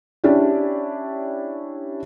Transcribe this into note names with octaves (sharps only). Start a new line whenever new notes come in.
C#4 D4 E4 G4 D5